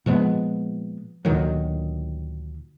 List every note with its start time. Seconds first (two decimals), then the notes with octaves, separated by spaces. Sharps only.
0.06 A#2 F3 G#3 B3
1.25 D2 A#2 D#3 F#3